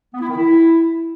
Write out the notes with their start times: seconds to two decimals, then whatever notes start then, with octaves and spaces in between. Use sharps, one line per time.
0.14 B3
0.22 E4
0.29 D#3
0.36 E4